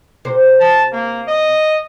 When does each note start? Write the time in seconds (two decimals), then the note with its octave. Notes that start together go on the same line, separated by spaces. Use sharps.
0.25 C3 C5
0.60 A5
0.92 A#3
1.28 D#5